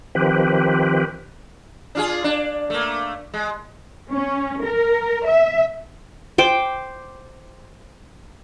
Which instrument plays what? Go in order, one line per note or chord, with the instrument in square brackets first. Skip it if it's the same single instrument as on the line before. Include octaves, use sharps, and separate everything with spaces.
[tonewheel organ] D#3 F3 C4 G4 B4
[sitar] D4 F4 G#4
D4
A3 A#3
G#3
[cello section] C#4
A#4
E5
[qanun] C5 G5 D6